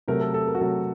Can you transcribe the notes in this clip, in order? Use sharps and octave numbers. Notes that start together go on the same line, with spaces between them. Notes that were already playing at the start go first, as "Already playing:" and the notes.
C3 F#3 A3 A#4
A4
A4
A#4
F#4
C3 F#3 A3 A4